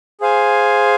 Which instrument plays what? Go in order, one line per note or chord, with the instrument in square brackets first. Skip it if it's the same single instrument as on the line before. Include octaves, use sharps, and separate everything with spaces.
[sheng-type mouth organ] G#4 C5 F5 G#5